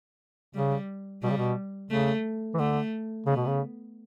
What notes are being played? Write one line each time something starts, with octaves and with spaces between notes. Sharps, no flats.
C#3 G3
B2 G3
C#3
B2
C#3 A3
E3
D3 A3
C#3 B3
B2
C#3